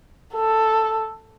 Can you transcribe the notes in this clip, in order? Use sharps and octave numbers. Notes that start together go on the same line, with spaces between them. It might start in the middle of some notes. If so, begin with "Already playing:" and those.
A4